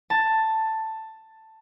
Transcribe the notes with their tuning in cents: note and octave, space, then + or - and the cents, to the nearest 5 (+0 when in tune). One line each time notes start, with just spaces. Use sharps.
A5 +10